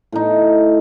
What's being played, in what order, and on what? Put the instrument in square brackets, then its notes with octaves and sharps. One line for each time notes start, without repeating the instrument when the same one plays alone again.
[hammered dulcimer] A2 D#4